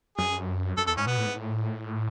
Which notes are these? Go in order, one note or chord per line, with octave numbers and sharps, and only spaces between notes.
F#2 G#4
F#2 A4
E2 A4
G#2 C#4
B2 B3
A2
G#2
A2